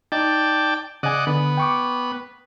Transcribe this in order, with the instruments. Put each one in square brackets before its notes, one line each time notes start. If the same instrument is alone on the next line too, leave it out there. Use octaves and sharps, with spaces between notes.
[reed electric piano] D#4 [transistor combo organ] D5 G5 A5
[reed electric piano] C#3 G#5 [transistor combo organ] D5 D#5 F#5
[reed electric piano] D3 [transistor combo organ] B3
[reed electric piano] G5 C#6 D6